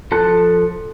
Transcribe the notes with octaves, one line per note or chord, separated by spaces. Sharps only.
F3 A4 A5 F#6